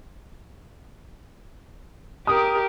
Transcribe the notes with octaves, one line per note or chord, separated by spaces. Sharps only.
G4 A#4 D#6